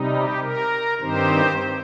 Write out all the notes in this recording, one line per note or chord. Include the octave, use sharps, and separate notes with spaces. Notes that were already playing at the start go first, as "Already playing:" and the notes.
Already playing: C3 G3 D#4
G4
A#4
G2 D#3 C4 D#4 G4 C5